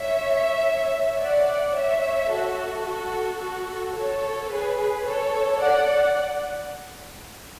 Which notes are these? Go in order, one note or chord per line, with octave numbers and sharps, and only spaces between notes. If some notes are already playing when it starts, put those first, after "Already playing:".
Already playing: C#5 E5
D5 F#5
C#5 E5
F#4 A4
F#4 A4
F#4 A4
A4 C#5
G#4 B4
A4 C#5
D5 F#5